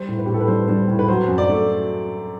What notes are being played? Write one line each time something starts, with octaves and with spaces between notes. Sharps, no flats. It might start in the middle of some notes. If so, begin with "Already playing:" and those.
Already playing: G3 C5
A2
B4
A2 G4
A4
B4
G3 C5
G3 C5
A2
B4
F#3 C5
F#2
D5
A3